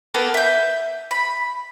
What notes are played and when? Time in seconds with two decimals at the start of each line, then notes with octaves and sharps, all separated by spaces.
0.14 A#3 B3 A4
0.34 E5 G6
1.11 B5